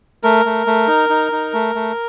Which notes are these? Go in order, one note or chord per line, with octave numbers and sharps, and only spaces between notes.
A3 A#4
A3
A3
D#4
D#4
D#4
A3
A3